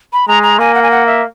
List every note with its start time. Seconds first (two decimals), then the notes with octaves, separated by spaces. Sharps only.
0.13 B5
0.28 G#3 A#5
0.43 A#5
0.59 A#3 G#5
0.74 F#5
0.83 G#5
0.91 F#5
1.07 E5